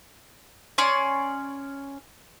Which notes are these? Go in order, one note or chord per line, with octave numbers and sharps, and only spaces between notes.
C#4 C#5 D5 C6